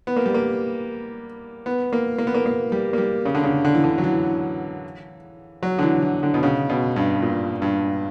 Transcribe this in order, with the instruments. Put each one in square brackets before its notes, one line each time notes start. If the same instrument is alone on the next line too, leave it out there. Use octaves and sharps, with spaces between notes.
[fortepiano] B3
A#3
G3
A#3
B3
A#3
A#3
B3
A#3
A#3
G3
A#3
G3
C#3
D3
C#3
D3
E3
D3
F#3
E3
F#3
D3
E3
E3
D3
B2
C#3
B2
G2
A#2
G2